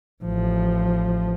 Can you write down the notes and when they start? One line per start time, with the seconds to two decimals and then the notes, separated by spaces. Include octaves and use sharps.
0.24 A1 F3